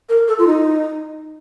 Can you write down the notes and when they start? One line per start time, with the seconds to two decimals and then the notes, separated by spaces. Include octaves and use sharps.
0.09 A#4
0.27 A4
0.38 F4
0.46 D#4